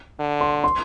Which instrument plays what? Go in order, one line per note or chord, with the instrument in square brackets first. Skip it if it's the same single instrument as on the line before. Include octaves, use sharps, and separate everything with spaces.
[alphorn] D3
[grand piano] C6
C6